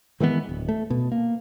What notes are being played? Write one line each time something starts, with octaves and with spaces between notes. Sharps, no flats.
D#3 E3 G#3 B3
D1
A3
B2
A#3